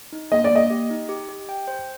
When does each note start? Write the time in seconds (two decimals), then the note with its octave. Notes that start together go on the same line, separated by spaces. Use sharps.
0.13 D#4
0.32 A#3 D#5
0.44 D5
0.51 A#3 D#5
0.70 G4
0.90 D#4
1.09 G4
1.29 G4
1.49 G5
1.68 C5